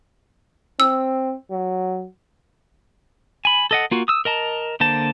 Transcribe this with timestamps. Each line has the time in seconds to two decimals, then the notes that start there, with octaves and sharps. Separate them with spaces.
0.80 C4 E6
1.50 F#3
3.45 G#5 B5
3.71 A4 D#5 F#5
3.91 A#3 F4 F#4
4.08 D#6 E6
4.25 A#4 D#5 A5 A#5
4.80 D3 A#3 C5 A5